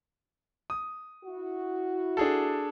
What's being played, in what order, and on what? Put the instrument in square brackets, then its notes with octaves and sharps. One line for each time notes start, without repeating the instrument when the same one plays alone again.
[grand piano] D#6
[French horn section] E4 F#4
[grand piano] D4 G#4 A4